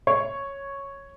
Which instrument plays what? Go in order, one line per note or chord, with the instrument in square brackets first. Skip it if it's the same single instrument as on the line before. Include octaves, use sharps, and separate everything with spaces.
[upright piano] C#5 C#6